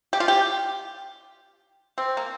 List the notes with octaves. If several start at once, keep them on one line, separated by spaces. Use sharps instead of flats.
G4
F4
G4
C4
A#3